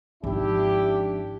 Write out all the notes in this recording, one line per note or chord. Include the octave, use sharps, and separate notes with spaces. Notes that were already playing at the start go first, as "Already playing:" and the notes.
G#1 F3 D4 E4 G4